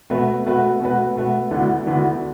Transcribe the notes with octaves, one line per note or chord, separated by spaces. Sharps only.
B2 A3 F#4 B4
B2 A3 F#4 B4
B2 A3 F#4 B4
B2 A3 F#4 B4
D2 D3 B3 E4
D2 D3 B3 E4